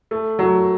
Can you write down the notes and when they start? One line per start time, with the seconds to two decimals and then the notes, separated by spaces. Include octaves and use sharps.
0.11 A3
0.39 F#3